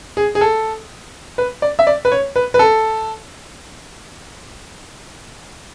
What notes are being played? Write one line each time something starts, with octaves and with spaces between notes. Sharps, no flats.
G#4
G#4
A4
B4
D5
E5
D5
B4
C#5
B4
B4
A4